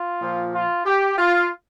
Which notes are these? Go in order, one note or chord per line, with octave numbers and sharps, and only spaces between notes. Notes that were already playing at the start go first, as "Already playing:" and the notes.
Already playing: F4
A#2 F3
F4
G4
F4